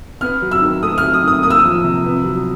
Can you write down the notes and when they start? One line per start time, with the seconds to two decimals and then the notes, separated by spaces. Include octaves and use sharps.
0.21 B3 F6
0.42 F#3
0.51 E6
0.62 D#3
0.83 A3 D#6
0.98 F6
1.03 F#3
1.14 D#6
1.24 D#3 D#6
1.43 A#3 D#6
1.50 E6
1.59 D#6
1.64 F3
1.84 C3
2.04 B3
2.24 F#3